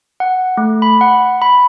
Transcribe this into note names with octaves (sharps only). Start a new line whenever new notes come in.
F#5
A3
B5
F#5
B5